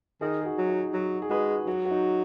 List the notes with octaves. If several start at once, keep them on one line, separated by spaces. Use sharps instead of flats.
D#3 D#4 G#4
G#4
F#4
F#3
D#4
F#3 F#4
G#4
G#3 F#4 B4
F#3 F#4
F#4
D#4